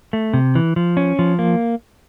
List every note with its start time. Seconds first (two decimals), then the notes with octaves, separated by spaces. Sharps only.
0.13 A3
0.34 C3
0.55 E3
0.76 F3
0.97 C#4
1.19 F3
1.39 A#3